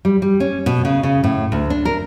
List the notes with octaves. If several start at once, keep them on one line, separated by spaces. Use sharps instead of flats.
G3
G3
C#4
B2
C#3
C#3
A2
D2
D4
A#4